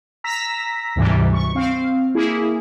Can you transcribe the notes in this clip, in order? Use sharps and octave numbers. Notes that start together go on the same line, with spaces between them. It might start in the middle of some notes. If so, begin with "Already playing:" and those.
A#5 E6 A#6 B6
D2 G#2 C3 E3 G3
C#6
C4 F5
A#3 E4 G#4